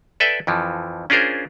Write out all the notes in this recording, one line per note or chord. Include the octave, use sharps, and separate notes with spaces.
A4 B4 D5 E5 G5
F2 E3 F3
C#4 D4 F4 G#4 A#4 C5